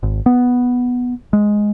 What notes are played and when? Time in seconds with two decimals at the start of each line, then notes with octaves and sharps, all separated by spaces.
0.03 G#1
0.26 B3
1.33 G#3